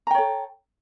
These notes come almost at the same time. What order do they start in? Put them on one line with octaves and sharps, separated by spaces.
A#5 G5 C#5 A4